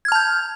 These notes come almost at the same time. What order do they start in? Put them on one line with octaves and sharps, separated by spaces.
G#6 F6 A5 G6